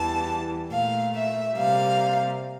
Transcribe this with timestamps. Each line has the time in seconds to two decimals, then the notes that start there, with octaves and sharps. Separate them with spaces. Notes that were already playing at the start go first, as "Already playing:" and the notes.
Already playing: E2 E3 G3 A5
0.71 A#2 A3 F5
1.14 E5
1.57 C3 G3 A#3 F5